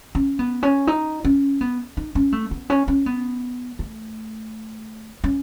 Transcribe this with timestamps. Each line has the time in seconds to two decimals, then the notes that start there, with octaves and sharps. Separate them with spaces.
0.15 C#4
0.39 B3
0.63 C#4
0.87 D#4
1.25 C#4
1.61 B3
1.97 D#4
2.15 C#4
2.32 A3
2.51 B3
2.70 C#4
2.88 C#4
3.06 B3
3.79 A3
5.24 C#4